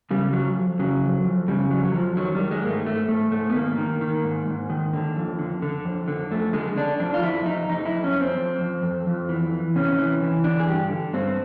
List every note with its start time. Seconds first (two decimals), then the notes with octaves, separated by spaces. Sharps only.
0.11 C#3 G3
0.33 F2 F#3
0.56 F2
0.79 C#3 F#3
1.02 F2
1.25 F2
1.48 C#3 G3
1.71 F2 F#3
1.85 F#3
1.94 F2 F3
2.17 D#3 F#3
2.35 G3
2.40 D#3
2.51 G#3
2.63 G#2 A#3
2.69 A3
2.86 G#2 A3
3.09 G#2 A3
3.32 G#2 A3
3.50 B3
3.55 D#3 A#3
3.78 D#3
4.01 D#3
4.24 G#2
4.48 G#2
4.70 D#3
4.94 D3
5.16 F2
5.39 D3
5.62 D3
5.85 F2
6.08 D3
6.31 F2 A3
6.53 D3 G#3
6.76 D3 D4
7.00 F2 D4
7.14 F4
7.23 F2 E4
7.45 F2 D#4
7.69 F2 D#4
7.85 E4
7.92 F2
8.04 C#4
8.15 F2
8.21 C4
8.37 F2
8.61 F2
8.83 F2
9.07 F2
9.29 E3
9.53 E3
9.76 C3 C#4
9.98 E3
10.22 E3
10.44 D3 D4
10.60 G#4
10.68 G2 G4
10.90 D3
11.13 G2 C4